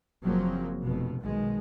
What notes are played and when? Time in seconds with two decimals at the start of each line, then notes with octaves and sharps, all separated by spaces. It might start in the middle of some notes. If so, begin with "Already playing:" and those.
0.23 F#1 F3 F#3 A#3 C4
0.82 F1 B2
1.21 B1 B2 D#3 G#3